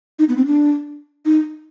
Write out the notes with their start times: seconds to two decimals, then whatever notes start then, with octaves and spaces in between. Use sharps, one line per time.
0.19 D#4
0.29 B3
0.37 C4
0.46 D4
1.25 D#4